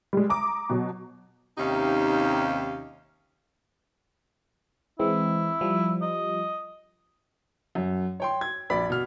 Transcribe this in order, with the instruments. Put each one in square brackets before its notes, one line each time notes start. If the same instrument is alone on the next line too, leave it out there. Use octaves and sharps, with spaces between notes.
[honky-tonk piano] G3 G#3
A#5 D6 D#6
B2 F#3
[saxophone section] D#2 C3 C#4 D#4 G4 F5
[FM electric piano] E3 G#3 C4 [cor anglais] E4
[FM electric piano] F3 G3
[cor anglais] D#5
[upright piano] F#2
C#5 G5 C6
G#6
A#1 D5 B5 B6
B2 F6